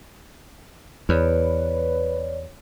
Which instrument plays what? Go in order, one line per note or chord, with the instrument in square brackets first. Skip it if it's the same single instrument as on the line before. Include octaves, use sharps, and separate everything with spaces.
[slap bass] E2 [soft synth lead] B4 [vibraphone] C#5 D5